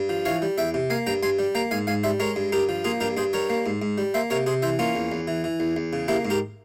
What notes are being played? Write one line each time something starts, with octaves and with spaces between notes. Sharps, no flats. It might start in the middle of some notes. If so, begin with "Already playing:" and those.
Already playing: G2
F3
E3 C#5 F5
G3
E2 E5 G5
C3
A#3 F5 G#5
G2 G5 A#5
G2 G#5 C6
G3
A#3 G5 A#5
G#2 F5 G#5
G#2 F5 G#5
G3 C5 E5
G#3 A#4 C#5
G2
G2 G4 A#4
F3
A#3 F4 G#4
G2 G4 A#4
G2 G#4 C5
G3 A#4 C#5
A#3
G#2
G#2
G3
A#3 C5 E5
C3 A#4 C#5
C3 G#4 C5
E3 C5 E5
A#3 C#4 F4
E2
E2
E3
E3
E2
E2
C#3
A#3 E4 G4
G#2
G4 A#4